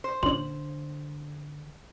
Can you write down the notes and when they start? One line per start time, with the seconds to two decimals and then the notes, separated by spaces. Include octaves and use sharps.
0.04 C5
0.23 A#2 D3 C#4 C6 F#7